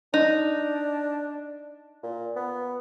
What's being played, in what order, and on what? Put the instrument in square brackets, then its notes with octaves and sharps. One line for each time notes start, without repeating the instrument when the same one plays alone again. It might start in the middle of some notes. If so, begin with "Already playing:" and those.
[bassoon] D4 [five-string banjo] D#4
[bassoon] A#2
B3